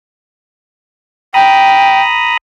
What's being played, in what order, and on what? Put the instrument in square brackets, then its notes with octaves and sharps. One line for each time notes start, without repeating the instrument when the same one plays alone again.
[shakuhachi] G5 [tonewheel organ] A#5 B5 D#6